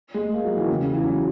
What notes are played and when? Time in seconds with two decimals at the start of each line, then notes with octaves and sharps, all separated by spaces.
0.14 G#3
0.33 A#3
0.45 F#3
0.57 E3
0.63 D#3
0.69 C#3
0.81 C#3
0.93 E3
1.05 F#3